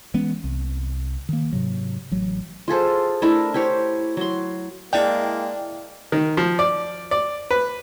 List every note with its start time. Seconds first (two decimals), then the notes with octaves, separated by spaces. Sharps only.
0.14 E3 G#3 B3 C#4
0.44 C2
1.29 D#3 A#3
1.53 G#2 C3 F#3
2.11 A1 F#3
2.68 F4 G#4 A4 C5
3.22 A3 D4 E4 A#4
3.54 E4 G4 C5 C#5
4.17 F#3 C6
4.93 G#3 A#3 D4 E4 D5 E5 G5
6.12 D#3
6.37 F3
6.59 D5
7.11 D5
7.51 B4